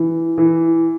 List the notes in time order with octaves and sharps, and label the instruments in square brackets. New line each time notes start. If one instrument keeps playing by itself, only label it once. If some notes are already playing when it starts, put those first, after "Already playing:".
Already playing: [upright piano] E3
E3